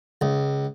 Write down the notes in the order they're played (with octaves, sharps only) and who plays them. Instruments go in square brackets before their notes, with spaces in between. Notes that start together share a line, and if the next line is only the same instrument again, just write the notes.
[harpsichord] C#2